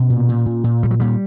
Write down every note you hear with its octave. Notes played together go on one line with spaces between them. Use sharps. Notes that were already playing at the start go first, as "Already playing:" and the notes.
Already playing: B2 C#4
A#2
A#2
A#2
A#2
A#2 G3
F#3
A#2 G3